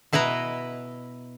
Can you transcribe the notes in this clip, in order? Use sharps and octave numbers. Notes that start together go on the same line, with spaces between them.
B2 E4 B4 D#5 A#5